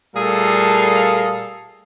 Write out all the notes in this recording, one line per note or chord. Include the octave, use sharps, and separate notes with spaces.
A#2 G3 A3 G#4 A4 F5